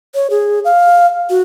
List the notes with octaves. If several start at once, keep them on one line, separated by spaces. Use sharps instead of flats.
C#5
G#4
F5
F#4